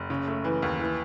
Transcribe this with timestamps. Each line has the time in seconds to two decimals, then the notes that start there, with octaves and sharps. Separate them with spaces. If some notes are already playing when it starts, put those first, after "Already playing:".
Already playing: F#1
0.10 C#3
0.27 A3
0.44 E3
0.62 D#2
0.80 E3